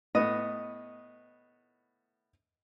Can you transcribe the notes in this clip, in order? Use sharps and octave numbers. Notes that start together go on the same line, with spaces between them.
A2 B3 D#5